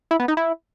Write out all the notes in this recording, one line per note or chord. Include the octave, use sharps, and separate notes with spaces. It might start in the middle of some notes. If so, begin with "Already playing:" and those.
E4
B3
D#4
E4